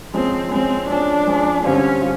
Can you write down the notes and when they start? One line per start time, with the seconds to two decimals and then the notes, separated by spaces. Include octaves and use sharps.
0.13 F3 G#3 C4 C#4
0.51 F3 G#3 C4 C#4
0.89 F3 G#3 C#4 D4
1.27 F3 G#3 C#4
1.64 G2 D3 G3 C4 C#4 F4
2.02 G3 F4